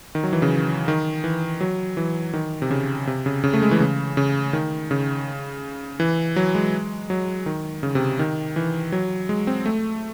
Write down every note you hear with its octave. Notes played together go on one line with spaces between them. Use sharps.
D#3
F#3
E3
C#3
D#3
E3
F#3
E3
D#3
C3
C#3
C3
C#3
C#3
A3
G#3
E3
C#3
C#3
D#3
C#3
E3
F#3
G#3
F#3
D#3
C#3
C3
D#3
E3
F#3
G#3
C4
A3